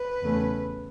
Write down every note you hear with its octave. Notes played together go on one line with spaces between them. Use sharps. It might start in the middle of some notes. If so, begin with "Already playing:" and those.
Already playing: B4
E2 C#3 A3 C#4